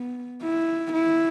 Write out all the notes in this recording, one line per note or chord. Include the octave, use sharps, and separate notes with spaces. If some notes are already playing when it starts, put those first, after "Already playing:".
Already playing: B3
E4
E4